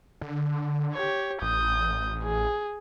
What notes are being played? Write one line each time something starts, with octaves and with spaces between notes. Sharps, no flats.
D3
G4 C#5
A1 D#6 G6
G#4